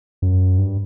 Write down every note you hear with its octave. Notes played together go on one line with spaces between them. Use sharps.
F#2
G2